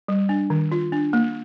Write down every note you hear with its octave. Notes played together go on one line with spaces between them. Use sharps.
G3
D4
D#3
F4
D4
A#3